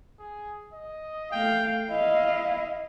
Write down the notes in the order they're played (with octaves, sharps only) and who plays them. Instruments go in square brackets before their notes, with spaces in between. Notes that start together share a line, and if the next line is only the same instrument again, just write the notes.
[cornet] G#4
D#5
[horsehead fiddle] A3 F5 [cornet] G5
[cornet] E4 [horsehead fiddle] D#5 F5